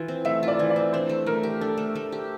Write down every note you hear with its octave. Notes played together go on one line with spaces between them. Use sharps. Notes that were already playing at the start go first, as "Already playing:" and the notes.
Already playing: E3 F4
C4
A3 E5
F4
D5
E3
D5
C4
D4 C5
A3
A3 A#4
G4
D4 A4
A3
A3
G4